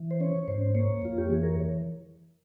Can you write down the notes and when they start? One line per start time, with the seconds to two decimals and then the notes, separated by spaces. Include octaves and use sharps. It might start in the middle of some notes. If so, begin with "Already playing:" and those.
Already playing: E3
0.11 C5
0.20 C#4 C#5
0.48 G#2 C5
0.75 A#3 C#5
1.02 F2 F4
1.18 G4
1.29 E3 G#4
1.43 A#4